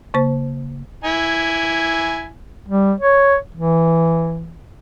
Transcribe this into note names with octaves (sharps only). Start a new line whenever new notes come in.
C#3 A#3 C5
E4 G#5
G3
C#5
E3